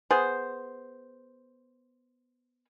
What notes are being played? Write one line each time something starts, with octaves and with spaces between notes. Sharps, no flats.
B3 G#4 C5